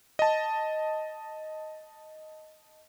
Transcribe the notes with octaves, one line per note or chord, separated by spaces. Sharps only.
D#5 A5